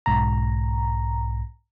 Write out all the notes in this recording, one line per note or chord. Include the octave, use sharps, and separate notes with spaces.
B1 G#2 A#5